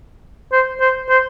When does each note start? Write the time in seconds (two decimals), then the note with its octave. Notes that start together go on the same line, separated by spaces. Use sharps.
0.52 C5
0.81 C5
1.09 C5